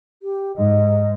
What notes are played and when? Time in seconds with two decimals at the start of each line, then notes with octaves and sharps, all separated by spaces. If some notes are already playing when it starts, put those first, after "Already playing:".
0.23 G4
0.57 G#2 D#5